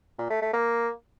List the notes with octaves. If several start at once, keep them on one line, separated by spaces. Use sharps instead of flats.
A#2
A3
A3
A#3